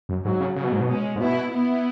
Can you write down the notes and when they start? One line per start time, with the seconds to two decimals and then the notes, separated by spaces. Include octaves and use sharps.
0.09 F#2
0.25 G#2 F#3
0.40 C#3
0.56 C#3 F#3
0.64 B2
0.72 G#2
0.81 B2
0.88 G#3 C#4
1.16 G#2
1.20 B2 B3 E4
1.52 B3 E4